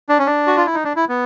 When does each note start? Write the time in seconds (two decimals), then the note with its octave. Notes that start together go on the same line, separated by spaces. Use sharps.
0.09 D4
0.18 C#4
0.27 D4
0.47 F#4
0.57 F4
0.66 E4
0.74 D#4
0.84 D4
0.96 E4
1.09 B3